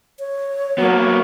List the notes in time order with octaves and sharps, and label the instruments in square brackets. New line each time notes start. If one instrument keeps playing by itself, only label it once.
[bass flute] C#5
[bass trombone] F#3 [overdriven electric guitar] A#3 B3